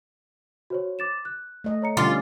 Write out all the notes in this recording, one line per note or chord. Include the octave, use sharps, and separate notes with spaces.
F#4 C5 C#5
D6 A6 E7
F#6
A3 D#5
C#5 A#5 C#7
D3 G3 C#4 F4 D6 A6 C7